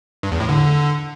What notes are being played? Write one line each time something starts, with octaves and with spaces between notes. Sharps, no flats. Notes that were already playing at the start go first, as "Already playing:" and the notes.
G2
E2
A2
D3